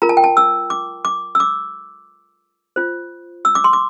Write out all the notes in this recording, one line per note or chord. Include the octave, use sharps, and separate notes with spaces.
F4 A#4 A#5
A5
G5
A5
E6
D6
D6
E6
D6
F4 C5
E6
D6
C6
D6